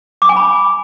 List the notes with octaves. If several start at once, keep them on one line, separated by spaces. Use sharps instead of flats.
D6
G#5
B5